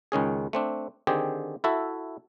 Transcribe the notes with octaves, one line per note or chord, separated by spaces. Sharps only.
C#2 D#3 C#4 G#4
A3 C4 D4
D3 D#3 C4 G4 G#4
E4 F#4 A4 E5